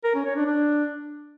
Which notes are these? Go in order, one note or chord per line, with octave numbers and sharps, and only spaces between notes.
A#4
C#4
C#5
D4
D4